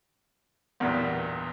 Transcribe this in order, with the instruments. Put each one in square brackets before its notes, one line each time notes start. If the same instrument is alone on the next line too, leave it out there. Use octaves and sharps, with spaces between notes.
[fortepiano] B1 E2 G2 A#2